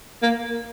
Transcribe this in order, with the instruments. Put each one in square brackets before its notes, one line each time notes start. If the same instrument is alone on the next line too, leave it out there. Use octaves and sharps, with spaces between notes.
[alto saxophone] A#3